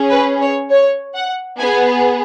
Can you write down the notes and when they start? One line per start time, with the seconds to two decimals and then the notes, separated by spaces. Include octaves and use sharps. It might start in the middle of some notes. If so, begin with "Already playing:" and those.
Already playing: C#4 G#4
0.11 B4
0.41 C#5
0.71 C#5
1.16 F#5
1.59 B3 G#4 G#5